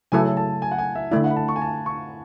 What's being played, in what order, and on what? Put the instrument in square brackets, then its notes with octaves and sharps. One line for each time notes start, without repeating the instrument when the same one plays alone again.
[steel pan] C#3 F#3 A3 E4 A4 [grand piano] G#5
[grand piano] A5
G#5
F#5
G#5
E5
[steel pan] D3 A3 E4 [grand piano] D5
[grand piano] F#5
B5
A5
C#6
G#5
A5
C#6